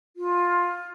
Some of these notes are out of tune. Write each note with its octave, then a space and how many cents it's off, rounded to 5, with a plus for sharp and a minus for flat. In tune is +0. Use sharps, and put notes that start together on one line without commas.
F4 +15